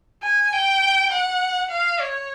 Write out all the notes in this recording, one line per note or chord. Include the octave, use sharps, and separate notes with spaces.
G#5
G5
F#5
F5
C#5